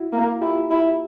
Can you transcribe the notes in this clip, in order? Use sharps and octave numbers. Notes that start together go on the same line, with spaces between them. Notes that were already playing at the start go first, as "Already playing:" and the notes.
Already playing: E4 F#4
A#3
E4 F4 G4
E4